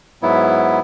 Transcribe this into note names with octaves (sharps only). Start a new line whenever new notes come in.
G#2 F#3 B3 E4